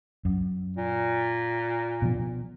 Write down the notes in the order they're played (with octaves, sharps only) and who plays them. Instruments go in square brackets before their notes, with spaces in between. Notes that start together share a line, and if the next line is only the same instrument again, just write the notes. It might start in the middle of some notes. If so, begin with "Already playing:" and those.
[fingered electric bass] F#2
[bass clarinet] A#2
[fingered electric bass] B2 F3